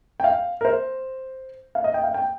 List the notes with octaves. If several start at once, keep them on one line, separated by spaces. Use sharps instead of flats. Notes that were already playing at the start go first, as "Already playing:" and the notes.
G5
F5
A#4
C5
F5
D#5
G5
F5
G5